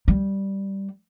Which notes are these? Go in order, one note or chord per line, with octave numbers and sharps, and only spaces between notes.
G3